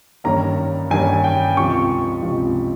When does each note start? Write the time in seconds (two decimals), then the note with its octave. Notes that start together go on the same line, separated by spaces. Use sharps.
0.24 G2 D#3 G3 A#3 C#4 A#5
0.90 G2 D#3 G3 A#3 C#4 G#5
1.24 G5
1.57 C#2 C3 F3 C#6
2.22 C#2 C3 F3